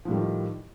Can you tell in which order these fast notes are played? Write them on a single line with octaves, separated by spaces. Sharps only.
F3 A2 G3 D#3